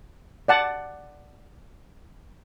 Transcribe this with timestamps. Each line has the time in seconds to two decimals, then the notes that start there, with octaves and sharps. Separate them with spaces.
0.48 D5 F#5 A5